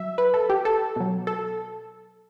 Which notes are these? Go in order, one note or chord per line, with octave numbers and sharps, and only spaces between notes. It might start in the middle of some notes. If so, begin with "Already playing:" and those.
Already playing: F#3 E5
B4
A4
G4
A4
B2 F#3
A4